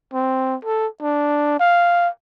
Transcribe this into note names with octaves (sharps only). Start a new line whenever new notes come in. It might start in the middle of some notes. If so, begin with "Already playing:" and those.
C4
A4
D4
F5